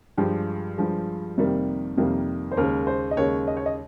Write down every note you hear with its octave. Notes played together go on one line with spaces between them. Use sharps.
G2 F3 G#3 G4
G2 F3 G#3
F2 C3 D#3 G3 A#3
F2 C3 D#3 G3 A#3
C5
D#2 C#3 G#3 A#4
C5
D#5
D#2 C#3 G#3 C#5
D#5
C#5
D#5